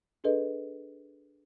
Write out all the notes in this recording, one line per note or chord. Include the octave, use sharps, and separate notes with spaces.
D4 G#4 A4 B4 D#5